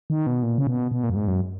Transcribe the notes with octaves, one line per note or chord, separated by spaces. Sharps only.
D#3
B2
A#2
C#3
B2
B2
A#2
F#2
G#2
F#2